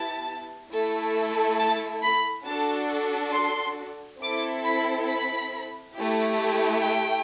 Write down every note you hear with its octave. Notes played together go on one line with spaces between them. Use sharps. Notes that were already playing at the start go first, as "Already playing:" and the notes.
Already playing: B3 E4 G4 A5
A3 E4 A4
A5
B5
D4 F#4 A4 A5
C6
C4 E4 A4 D6
B5
B5
A3 E4 G4
G5